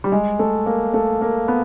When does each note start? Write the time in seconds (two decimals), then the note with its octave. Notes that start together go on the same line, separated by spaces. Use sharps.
0.04 G3
0.12 G#3
0.39 A3
0.66 A#3
0.94 A3
1.22 A#3
1.48 B3